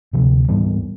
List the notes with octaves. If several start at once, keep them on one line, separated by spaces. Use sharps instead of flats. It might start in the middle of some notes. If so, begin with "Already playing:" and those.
D2 C3 F3
G#2 E3 G3 B3